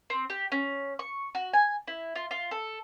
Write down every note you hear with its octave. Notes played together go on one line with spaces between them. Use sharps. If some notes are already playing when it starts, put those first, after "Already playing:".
C4
G4
C#4
C#6
F#4
G#5
E4
F4
F4
A4